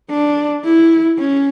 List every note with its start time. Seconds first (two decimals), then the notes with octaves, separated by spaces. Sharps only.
0.10 D4
0.65 E4
1.18 C#4